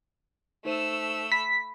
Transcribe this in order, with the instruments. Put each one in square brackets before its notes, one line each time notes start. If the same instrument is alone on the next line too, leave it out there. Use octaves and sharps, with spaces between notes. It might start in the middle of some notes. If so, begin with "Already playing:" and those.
[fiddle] A3 E6 [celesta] D#4 C5 D#7
[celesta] B5 [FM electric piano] B6